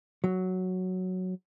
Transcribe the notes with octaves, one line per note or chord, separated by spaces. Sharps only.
F#3